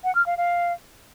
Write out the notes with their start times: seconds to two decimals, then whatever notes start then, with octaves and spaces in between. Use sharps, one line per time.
0.04 F#5
0.15 F6
0.26 F5
0.37 F5